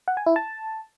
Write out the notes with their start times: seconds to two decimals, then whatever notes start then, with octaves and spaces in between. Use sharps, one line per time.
0.08 F#5
0.17 G#5
0.27 E4
0.36 A5